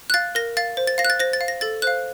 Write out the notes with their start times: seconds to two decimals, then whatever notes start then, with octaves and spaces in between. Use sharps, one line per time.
0.10 F#6
0.14 F5 A6
0.35 A#4 A#6
0.57 F5 A6
0.77 C5
0.87 A6
0.98 F5 A#6
1.05 F#6
1.10 A6
1.20 C5 A#6
1.33 A6
1.41 F5
1.48 A#6
1.61 A4 A6
1.82 C5 F5 F#6